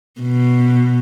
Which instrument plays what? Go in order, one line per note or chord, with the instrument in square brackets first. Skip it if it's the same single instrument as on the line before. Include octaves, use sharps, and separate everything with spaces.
[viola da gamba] B2